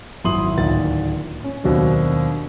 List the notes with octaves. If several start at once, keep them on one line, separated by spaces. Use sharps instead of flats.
G#1 F#2 E4 C6 D#6 F#7
D1 A#2 D#3 A6
C#4
D#2 B2 F#3 C4 D4